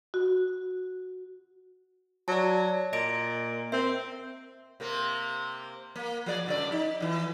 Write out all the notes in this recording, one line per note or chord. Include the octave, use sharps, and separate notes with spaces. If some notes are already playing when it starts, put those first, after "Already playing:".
F#4
F#3 D5 A5
A#2 D#5 A#6 D7
C4 A#4 E5
C3 A#3 C4
A#3
F3 G#4 D5
G2 C#3 D5
D#4
F2 E3